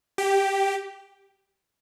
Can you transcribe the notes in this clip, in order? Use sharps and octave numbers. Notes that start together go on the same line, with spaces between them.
G4